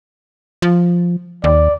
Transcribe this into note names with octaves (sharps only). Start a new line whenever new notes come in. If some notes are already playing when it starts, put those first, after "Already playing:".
F3
D#2 D5